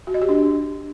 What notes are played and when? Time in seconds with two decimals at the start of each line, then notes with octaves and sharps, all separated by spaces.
0.07 F#4
0.14 D#5
0.22 G4
0.29 D4